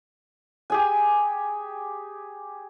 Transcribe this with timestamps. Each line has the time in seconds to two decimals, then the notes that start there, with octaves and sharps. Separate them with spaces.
0.70 G4 G#4 G#5